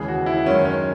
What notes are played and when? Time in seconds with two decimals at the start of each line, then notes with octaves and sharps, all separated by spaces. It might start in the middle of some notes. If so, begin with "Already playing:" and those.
Already playing: D#2 C#3 E3 G#3 G#4
0.08 F#4
0.26 E4
0.46 F#2 D#3 G#3 C#4
0.65 C#4